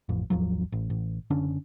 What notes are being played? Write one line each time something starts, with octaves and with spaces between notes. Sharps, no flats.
A1 F2
G#1 D#2 F3 F#3
A1
A1
F#1 D3 C#4 D4